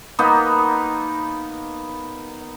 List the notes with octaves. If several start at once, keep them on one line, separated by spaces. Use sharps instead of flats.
A#3 B3 D#4